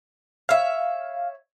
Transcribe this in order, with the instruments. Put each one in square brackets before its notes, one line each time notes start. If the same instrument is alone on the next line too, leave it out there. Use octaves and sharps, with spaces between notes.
[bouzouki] C#5 E5 [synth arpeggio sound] F5